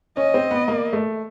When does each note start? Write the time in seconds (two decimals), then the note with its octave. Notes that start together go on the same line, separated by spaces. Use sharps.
0.17 C#4 D#5
0.34 C4
0.51 B3
0.68 A#3
0.93 A3